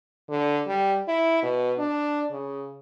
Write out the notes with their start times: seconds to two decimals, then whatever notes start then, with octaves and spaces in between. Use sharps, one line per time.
0.30 D3
0.68 G3
1.08 E4
1.43 B2
1.79 D4
2.31 C#3